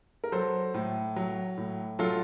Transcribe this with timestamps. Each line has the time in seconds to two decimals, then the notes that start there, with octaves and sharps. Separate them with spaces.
0.24 A#4
0.32 F#3 A4 C5
0.74 A2
1.16 F#3
1.57 A2
1.99 F#3 F4 A4